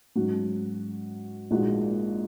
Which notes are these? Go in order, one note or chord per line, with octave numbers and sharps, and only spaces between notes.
G#2 F#3 C#4 F#4
A#1 A#2 G#3 D#4 F#4